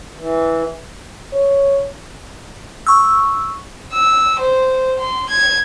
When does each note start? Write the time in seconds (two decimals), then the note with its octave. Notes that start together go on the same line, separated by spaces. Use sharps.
0.17 E3
1.33 C#5
2.87 C#6 E6
3.93 E6
4.40 C5
4.99 C6
5.30 G#6